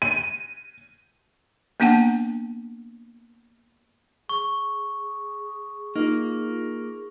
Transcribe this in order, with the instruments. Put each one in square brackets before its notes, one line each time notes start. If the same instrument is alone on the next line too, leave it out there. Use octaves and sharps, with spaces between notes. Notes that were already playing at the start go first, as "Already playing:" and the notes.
[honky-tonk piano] D#7
[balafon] A#3 B3 D4 F#5 G5 A5
[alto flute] G#4 [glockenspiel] C#6
[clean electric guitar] A#3 [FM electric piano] D#4 F4